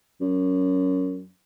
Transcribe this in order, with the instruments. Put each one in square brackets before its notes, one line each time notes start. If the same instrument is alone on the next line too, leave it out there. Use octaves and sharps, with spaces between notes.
[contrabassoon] F#2